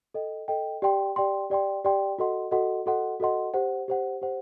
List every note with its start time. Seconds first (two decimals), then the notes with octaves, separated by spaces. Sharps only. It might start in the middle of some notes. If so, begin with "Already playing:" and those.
0.14 A4 D#5 G5
0.48 A4 D#5 G5
0.82 G4 D5 G5 C6
1.16 G4 D5 G5 C6
1.50 G4 D5 G5 C6
1.85 G4 D5 G5 C6
2.18 F#4 A4 D#5 F#5 C6
2.51 F#4 A4 D#5 F#5 C6
2.86 F#4 A4 D#5 F#5 C6
3.20 F#4 A4 D#5 F#5 C6
3.54 G4 C5 F#5
3.88 G4 C5 F#5
4.22 G4 C5 F#5